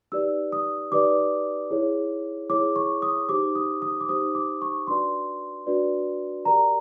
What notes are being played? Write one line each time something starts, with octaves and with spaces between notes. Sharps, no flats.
D#4 G4 B4 D5 E6
D#6
D#4 G4 B4 D5 D6
E4 G#4 C#5
E4 G#4 C#5 D6
C#6
D#6
D#4 G4 C5 D6
D#6
D#6
D6
D#4 G4 C5 D#6
D6
C#6
D4 F#4 B4 D5 C6
D4 F#4 B4 D5
G4 A#4 D5 A#5